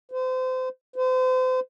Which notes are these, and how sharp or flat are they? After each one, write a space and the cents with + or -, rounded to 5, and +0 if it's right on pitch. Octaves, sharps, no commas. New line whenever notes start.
C5 -30
C5 -35